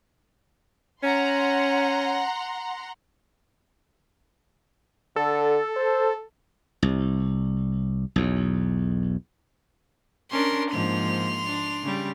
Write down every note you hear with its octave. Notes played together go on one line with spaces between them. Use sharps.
C#4 F#5 A#5 C6
D3 A4
C5
C2
B1 E2
C#4 D4 A#4 C6
G#2 F3 A#3 C6 F7
D4
C#3 G3